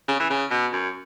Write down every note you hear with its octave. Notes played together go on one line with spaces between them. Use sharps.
C#3
E3
C#3
B2
F#2